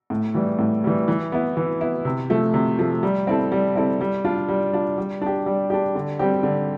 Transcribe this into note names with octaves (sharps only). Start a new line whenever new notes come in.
A2
E3 G3
A2
E3 G3
E3
B3 E4
E3
B3 E4
C3
F3 A3
C3
F3 A3
G3
C4 E4 A4
G3
C4 E4 A4
G3
D4 F4
G3
D4 F4
G3
D4 G4
G3
D4 G4
D3
G3 C4 G4
D3